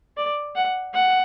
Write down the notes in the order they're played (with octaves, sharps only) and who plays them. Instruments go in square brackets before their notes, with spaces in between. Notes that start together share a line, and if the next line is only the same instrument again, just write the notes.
[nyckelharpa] D5
F#5
F#5